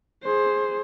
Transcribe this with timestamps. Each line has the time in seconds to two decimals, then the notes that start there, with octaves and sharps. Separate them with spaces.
0.23 G#4 C5